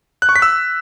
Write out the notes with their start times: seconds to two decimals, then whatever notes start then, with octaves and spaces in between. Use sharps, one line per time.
0.22 F#6
0.29 C#6
0.36 B6
0.42 E6